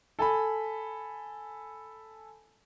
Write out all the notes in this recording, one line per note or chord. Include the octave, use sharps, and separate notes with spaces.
A4 G#5 B5